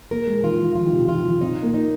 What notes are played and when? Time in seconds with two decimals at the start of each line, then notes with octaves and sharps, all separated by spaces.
0.11 A#3 A#4
0.27 G#3
0.44 D#3 F4
0.60 D#3
0.76 F3 F4
0.85 D#3
0.93 C3
1.09 D#3 F4
1.25 F3
1.41 C4 D#4
1.63 A#3
1.74 D#4